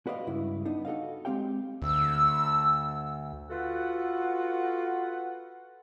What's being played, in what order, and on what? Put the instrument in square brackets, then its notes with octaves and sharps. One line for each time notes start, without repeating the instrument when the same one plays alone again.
[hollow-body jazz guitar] F#4 B4 C5 D5 D#5 F5
C#2 G2 C#3 E4
B3 D4 D#4
F#4 A4 D#5 F5
G#3 A3 C4 G4 F5 G5
[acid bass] D2 [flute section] E6
[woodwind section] F4 F#4 A4 B4 F#5